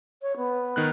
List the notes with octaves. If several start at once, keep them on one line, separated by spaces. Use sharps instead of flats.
C#5
B3
D#3 B3 F#6